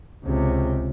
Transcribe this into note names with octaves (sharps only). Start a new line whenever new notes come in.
C#2 C3